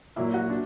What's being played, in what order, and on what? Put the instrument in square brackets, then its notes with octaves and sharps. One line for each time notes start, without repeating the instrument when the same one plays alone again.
[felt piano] A#2 F#3 A#3 E4 E5
F#4 F#5
D4